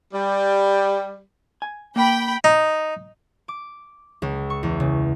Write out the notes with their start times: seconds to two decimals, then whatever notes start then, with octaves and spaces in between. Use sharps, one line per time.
0.13 G3
1.62 G#5
1.96 A#3 G5 B5
2.44 D#4
3.48 D6
4.22 C#2
4.50 C#6
4.63 E2
4.80 C#3